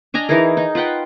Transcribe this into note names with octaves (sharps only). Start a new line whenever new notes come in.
D4 D#5 G#5 A#5
E3 D#4 G#4 A#4
D#4
F4 B4 F#5 G5